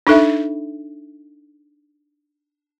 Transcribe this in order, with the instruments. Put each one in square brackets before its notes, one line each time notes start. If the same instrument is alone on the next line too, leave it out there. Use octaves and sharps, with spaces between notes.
[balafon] D4 D#4 A4 E5